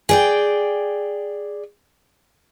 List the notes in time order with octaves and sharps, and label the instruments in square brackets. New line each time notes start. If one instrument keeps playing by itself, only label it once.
[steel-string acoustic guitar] G#4 D5 G5